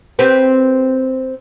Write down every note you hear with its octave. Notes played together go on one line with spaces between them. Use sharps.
C4 G4 B4